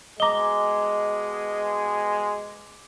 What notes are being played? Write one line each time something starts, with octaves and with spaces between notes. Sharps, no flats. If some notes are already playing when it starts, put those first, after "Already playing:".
B2 G#3 D#5 A#5 D6 G7